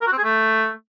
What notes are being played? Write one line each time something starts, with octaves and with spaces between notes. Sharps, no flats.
A#4
F#4
C4
G#4
A3